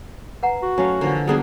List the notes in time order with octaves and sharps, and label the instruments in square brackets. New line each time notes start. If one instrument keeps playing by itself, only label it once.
[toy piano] B4 F#5 A#5
[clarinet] F#4
[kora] F#3 A3 F5 [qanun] C#4
[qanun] D3 [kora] E3 F3 A#3
[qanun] F#3 B3 D4 [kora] G3 A#3 [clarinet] G#4